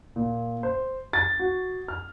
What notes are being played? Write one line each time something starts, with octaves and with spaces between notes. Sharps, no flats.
A#2
C5
A6
F#4
F6